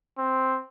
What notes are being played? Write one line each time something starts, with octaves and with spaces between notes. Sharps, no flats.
C4